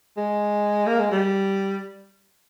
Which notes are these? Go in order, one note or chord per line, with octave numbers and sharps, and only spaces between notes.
G#3
A#3
G#3
G3